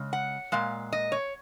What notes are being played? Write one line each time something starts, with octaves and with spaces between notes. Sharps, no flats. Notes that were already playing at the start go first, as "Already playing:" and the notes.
Already playing: C#3 G#3
F#5
A#2 G#3 F5
D#5
C#5